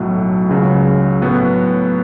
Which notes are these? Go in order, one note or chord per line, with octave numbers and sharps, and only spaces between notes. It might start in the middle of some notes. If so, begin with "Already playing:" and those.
Already playing: B1 A2 F#3 A3
C#2 C#3 F#3
A2 F#3 B3 F#4